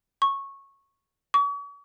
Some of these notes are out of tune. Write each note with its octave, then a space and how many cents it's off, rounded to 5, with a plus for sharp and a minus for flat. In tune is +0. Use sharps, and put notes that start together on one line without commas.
C#6 -10
C#6 +40